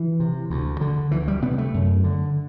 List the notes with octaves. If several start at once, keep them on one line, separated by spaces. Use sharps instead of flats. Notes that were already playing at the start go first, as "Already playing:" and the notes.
Already playing: E3
C3
D2
D3
D2 E3
G3
C3 B3
A3
F#2
D3